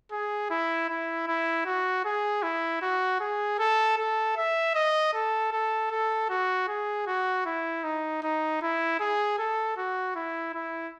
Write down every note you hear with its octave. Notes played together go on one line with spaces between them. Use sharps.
G#4
E4
E4
E4
F#4
G#4
E4
F#4
G#4
A4
A4
E5
D#5
A4
A4
A4
F#4
G#4
F#4
E4
D#4
D#4
E4
G#4
A4
F#4
E4
E4